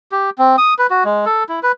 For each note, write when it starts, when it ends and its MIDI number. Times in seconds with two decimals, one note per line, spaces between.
0.12 0.30 67
0.38 0.56 60
0.58 0.74 87
0.79 0.87 71
0.90 1.04 66
1.05 1.25 56
1.26 1.44 69
1.49 1.60 64
1.63 1.72 71